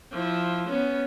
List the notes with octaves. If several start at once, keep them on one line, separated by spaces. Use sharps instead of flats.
F3 E4
B3 C#4